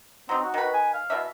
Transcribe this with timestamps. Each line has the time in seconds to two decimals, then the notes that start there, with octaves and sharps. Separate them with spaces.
0.29 F#3 C4 D#4
0.42 F#4
0.54 D#3 B4
0.74 G#5
0.94 F5
1.10 B2 E3 E5